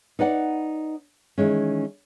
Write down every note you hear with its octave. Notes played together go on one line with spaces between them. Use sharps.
D#4 B4 D5 F#5
D#3 E3 G#3 C#4